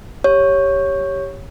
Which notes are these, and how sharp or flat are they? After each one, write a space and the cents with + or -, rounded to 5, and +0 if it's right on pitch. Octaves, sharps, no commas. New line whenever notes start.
G4 +0 C#5 +0